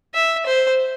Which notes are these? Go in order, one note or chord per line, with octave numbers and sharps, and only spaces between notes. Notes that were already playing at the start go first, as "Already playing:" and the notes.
E5
C5